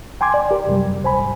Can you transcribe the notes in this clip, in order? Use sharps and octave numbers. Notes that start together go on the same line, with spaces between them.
G5 G#5 C6 D6 G#6
D5
G4 A#4 G5
F#2 C3 F#3 G3
D2 C5 G#5 B5
G#2